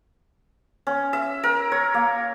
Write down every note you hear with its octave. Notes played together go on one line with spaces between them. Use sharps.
C#4
E5
A#4
C#5
A#3